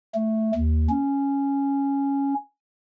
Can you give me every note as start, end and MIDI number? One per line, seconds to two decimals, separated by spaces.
0.15 0.52 57
0.55 0.88 39
0.89 2.34 61